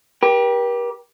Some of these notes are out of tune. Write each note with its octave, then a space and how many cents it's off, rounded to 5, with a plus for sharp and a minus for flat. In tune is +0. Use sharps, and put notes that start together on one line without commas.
G4 +0 A#4 +45